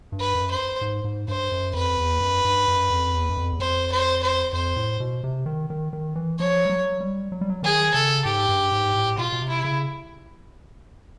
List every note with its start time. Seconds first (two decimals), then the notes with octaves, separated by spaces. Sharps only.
0.12 G2
0.20 B4
0.35 F#2
0.51 C5
0.82 G#2
1.04 G#2
1.28 G2 C5
1.52 F#2
1.74 F2 B4
1.98 E2
2.21 F#2
2.45 G2
2.68 F#2
2.90 F2
3.13 E2
3.29 F#2
3.38 F2
3.53 E2
3.60 F2 C5
3.91 C5
4.23 C5
4.53 F2 C5
4.76 A2
5.00 B2
5.24 C3
5.46 D#3
5.70 D#3
5.93 D#3
6.16 E3
6.39 F3 C#5
6.65 G3
6.70 F#3
7.01 G3
7.32 F#3
7.41 G3
7.49 F#3
7.63 D#3 G#4
7.94 C#3 A4
8.25 G#2 G4
8.49 G2
8.72 G#2
8.95 A2
9.18 B2 F4
9.33 B2
9.42 C3
9.48 E4
9.64 C#3